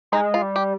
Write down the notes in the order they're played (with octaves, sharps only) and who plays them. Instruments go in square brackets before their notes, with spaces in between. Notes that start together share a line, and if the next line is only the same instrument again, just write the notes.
[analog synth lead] G#3 [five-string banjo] D#4
[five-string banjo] F4
[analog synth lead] G3
[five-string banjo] G4